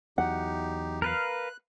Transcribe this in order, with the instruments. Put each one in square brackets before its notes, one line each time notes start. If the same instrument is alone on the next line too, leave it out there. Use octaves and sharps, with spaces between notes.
[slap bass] E2 F#3 [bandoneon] D#4 G4 [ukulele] F#5
[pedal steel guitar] A#4 B4 F5 [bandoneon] F#6